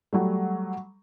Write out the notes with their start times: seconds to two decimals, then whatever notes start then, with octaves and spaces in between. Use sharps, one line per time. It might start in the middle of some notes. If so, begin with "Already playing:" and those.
0.13 F#3 G3 A3